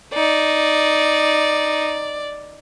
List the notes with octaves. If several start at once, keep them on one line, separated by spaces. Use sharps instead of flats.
D#4 D5